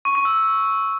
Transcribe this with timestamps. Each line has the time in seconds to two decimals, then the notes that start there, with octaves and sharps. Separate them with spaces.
0.05 C#6
0.15 C#6
0.25 E6